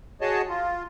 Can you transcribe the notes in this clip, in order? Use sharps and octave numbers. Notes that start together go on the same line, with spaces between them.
F#4 G#4 C#5 D#5 A5
F4